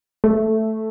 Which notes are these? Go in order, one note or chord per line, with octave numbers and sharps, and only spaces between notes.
A3